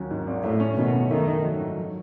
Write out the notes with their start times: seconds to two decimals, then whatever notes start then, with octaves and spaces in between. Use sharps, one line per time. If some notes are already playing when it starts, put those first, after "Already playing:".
Already playing: D#2 F#3 C#4
0.11 G#2
0.27 G#1
0.43 A2 A3
0.60 C#4
0.77 B2 D#3
0.94 F#2
1.10 D#3 A3
1.27 D#4
1.43 F#3
1.60 G#2
1.77 F#3